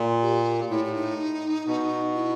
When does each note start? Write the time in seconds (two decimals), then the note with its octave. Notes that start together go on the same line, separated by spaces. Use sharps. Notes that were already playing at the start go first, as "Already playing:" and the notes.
Already playing: A#2
0.22 G4
0.70 A2 E4
0.85 E4
0.95 D#4
1.67 B2
2.15 E4